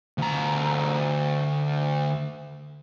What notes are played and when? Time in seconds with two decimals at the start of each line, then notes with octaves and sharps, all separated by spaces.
0.18 D2 A#5